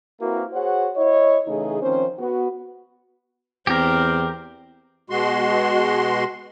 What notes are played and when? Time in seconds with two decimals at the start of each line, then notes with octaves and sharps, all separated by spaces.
0.21 A#3 C4 E4 F#4 A#4 B4
0.53 F#4 G#4 C5 C#5 F#5
0.96 E4 C#5 D#5
1.47 C#3 E3 A3 D#4 G#4
1.81 D#3 F3 C4 C#4 C5
2.19 B3 F#4
3.67 E2 C4 G4 A#4
5.10 B2 G#3 F#4 C6